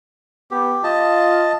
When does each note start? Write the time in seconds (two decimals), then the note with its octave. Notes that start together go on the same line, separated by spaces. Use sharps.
0.51 B3 G4
0.84 F4 D#5 A5